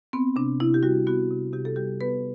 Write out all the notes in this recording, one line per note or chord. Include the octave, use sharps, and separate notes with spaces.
B3 C4
C3 D4
C3 E4
G4
G3 F#4
B3 F#4
C3
C3 G4
A4
G3 G4
B3 B4